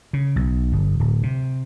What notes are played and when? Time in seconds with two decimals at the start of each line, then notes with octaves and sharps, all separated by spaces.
0.13 C#3
0.36 B1
0.72 G1
1.00 D1
1.23 C3